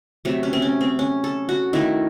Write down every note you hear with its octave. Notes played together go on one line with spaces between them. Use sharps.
C3 F#3 A3
C#4
C4
C#4
C4
C#4
A4
F#4
D#3 A3 E4